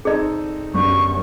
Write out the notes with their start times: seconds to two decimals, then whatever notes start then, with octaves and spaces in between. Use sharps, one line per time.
0.05 C4 D#4 G#4 A4 D5
0.74 F#2 D3 G3 B3 C#6